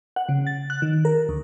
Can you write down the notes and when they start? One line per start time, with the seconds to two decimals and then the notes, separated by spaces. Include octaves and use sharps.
0.16 F#5
0.29 C#3
0.47 A6
0.70 F#6
0.82 D#3
1.05 A#4
1.29 D2